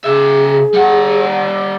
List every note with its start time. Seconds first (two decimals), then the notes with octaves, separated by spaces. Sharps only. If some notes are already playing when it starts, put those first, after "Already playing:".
0.04 C#3 G#4 E5
0.74 G3 F#5